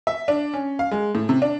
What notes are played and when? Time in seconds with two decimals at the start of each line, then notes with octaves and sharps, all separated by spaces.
0.07 E5
0.28 D4
0.54 C#4
0.79 F5
0.91 G#3
1.15 A2
1.29 C3
1.42 D4